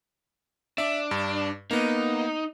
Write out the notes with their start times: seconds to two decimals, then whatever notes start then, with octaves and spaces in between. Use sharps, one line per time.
0.78 D4 E5
1.11 G2
1.71 A#3 B3 D#4